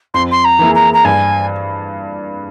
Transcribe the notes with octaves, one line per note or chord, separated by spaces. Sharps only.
F2 C6
C6
A#5
E3 A#3 E4 G#4
A#5
A#5
G2 G#5